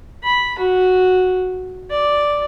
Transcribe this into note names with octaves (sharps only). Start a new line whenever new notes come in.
B5
F#4
D5